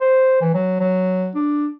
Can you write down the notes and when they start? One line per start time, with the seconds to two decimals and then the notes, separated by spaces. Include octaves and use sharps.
0.01 C5
0.41 E3
0.54 F#3
0.80 F#3
1.35 D4